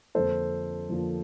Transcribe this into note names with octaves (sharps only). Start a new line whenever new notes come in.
F2 D3 F3 A#3 A4 C5
F2 D3 F3 A#3